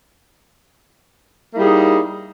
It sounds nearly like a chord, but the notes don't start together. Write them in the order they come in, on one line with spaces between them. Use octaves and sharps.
A#3 E4 G3 G#4 D#4